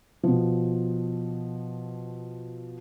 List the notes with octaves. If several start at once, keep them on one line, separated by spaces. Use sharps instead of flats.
B2 F3